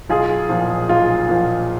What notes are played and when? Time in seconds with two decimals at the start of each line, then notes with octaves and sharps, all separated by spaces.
0.10 B1 F4 G#4
0.49 A#2 F3
0.89 B1 F4
1.28 A#2 F3